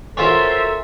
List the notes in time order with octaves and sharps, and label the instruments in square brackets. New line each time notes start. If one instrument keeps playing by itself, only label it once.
[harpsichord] C#4 F4 [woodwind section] F#4 C5 C6 [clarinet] A4 [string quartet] A#4 E5